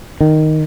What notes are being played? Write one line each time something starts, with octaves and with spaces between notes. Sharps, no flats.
D#3